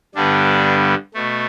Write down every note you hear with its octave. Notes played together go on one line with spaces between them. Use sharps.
G2 D3 G3 B3 D4
B2 A3